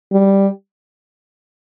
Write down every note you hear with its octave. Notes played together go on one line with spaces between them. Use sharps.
G3